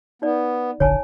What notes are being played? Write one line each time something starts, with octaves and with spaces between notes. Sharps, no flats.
B3 D#4 D5
F1 A#1 D3 C#5 G#5 A5